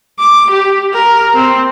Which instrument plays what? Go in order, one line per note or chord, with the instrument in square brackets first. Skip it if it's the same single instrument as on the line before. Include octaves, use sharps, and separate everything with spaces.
[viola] D6
G4
A#4
C4